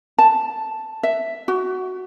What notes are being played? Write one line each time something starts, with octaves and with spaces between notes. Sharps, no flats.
A5
E5
F#4